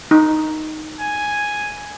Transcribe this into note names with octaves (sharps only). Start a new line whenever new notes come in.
D#4
G#5